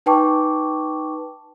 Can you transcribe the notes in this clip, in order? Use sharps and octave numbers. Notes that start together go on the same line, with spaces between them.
D#4 B4 G5 A5 C#6 D6